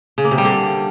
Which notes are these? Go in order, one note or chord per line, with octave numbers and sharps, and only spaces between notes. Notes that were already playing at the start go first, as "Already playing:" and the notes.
C#3
A#3
C3
G3
D3